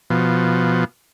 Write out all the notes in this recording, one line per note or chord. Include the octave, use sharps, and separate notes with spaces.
B2 F3